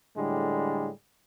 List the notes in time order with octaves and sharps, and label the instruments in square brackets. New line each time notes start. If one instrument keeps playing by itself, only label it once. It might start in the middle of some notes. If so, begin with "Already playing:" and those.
[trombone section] A2 D3 G3 G#3